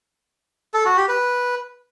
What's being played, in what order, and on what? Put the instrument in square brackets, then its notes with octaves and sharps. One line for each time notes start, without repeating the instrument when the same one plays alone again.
[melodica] A4
F#4
G4
B4